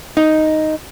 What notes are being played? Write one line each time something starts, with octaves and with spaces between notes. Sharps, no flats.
D#4